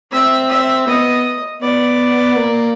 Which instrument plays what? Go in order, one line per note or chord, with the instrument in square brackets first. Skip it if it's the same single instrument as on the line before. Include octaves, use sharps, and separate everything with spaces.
[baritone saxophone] C4 [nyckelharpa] E5
[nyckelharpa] E5
[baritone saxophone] B3 [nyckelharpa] D#5
[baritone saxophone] B3 [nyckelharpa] D5
[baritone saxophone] A#3